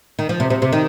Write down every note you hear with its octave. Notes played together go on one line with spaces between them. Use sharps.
D#3
F3
C3
C3
C3
D#3